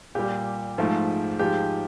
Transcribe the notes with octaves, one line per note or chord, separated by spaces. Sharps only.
A#2 G3 G4
G#2 F3 A3
G#2 F3 G#3 G4